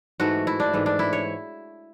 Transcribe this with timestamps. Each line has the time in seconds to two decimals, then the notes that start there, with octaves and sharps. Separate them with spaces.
0.20 G#2 E3 A3 F#4
0.47 E4
0.60 D4
0.73 G#2 E3 A3
0.86 D4
0.99 E4
1.13 C#5